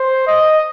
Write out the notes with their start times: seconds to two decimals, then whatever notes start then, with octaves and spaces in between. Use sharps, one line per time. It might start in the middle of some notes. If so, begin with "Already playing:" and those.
Already playing: C5
0.27 D#5